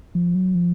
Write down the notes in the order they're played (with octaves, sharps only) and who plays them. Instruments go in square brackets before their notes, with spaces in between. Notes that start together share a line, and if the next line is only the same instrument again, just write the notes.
[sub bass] F3
F#3
F3